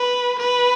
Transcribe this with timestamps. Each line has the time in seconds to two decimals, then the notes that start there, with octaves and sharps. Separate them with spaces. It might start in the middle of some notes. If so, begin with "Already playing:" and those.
Already playing: B4
0.39 B4